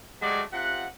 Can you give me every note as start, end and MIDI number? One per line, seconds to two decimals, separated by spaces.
0.22 0.42 54
0.22 0.42 56
0.22 0.42 57
0.22 0.42 67
0.22 0.42 74
0.52 0.86 48
0.52 0.86 65
0.52 0.86 78